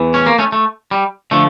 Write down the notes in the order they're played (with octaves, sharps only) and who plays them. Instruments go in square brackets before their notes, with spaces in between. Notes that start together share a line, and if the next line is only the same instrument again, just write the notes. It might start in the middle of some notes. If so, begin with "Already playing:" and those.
Already playing: [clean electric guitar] E2 E3
C#4
A#3
A3 C#4
A3
G3
D3 F3 A3